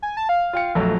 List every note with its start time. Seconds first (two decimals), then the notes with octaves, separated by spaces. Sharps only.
0.02 G#5
0.17 A5
0.29 F5
0.53 F4 G5 C#7
0.75 A#1 F2 F#3 A3